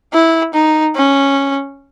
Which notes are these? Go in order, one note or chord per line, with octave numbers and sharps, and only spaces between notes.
E4
D#4
C#4